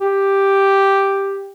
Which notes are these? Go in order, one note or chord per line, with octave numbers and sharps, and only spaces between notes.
G4